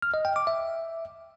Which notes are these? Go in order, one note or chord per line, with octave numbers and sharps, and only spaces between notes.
F6
D#5
G5
D6
E5